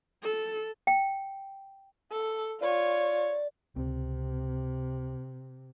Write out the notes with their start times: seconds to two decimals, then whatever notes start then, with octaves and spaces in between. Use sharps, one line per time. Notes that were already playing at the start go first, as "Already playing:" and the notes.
0.23 A4
0.87 G5
2.12 A4
2.61 F4 C#5 D5
3.76 C#2 C3 C4